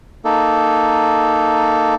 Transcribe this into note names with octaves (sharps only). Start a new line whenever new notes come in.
A#3 D#4 A4